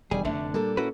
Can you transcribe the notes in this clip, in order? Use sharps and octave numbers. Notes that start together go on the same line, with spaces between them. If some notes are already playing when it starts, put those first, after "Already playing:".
E1 D#3 G3 G#4 G#5
F1 D3 A3 D4 E5
A#2 G3 A#3 A4
C#4 E4 F#4 B4